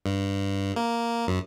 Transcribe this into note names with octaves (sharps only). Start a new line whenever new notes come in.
G2
A#3
F#2